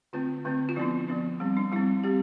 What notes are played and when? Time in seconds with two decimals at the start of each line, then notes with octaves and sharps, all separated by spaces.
0.13 D3 A3 C4 F4
0.45 D3 A3 C4
0.69 F4
0.76 F3 B3 D4 E4
1.08 F3 B3 D4
1.40 G3 C4
1.57 D4
1.72 G3 C4 E4
2.04 G3 C4 G4